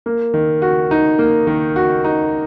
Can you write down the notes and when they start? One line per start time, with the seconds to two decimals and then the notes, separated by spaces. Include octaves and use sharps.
0.06 A#3
0.34 D#3
0.62 F#4
0.91 D#4
1.19 A#3
1.47 D#3
1.76 F#4
2.04 D#4